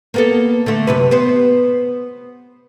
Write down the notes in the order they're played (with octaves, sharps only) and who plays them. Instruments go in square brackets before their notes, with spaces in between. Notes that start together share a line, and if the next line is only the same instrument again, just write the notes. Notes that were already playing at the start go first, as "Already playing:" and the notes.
[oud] A#3 B3 A4
D3 A3
F#2 C3 B4
B3 C5